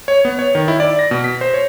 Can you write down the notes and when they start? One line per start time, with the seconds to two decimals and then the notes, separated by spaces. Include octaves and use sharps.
0.08 C#5
0.25 B3
0.39 C#5
0.55 D#3
0.68 E4
0.80 D5
0.99 A#6
1.11 B2
1.24 B6
1.41 C5
1.54 C#5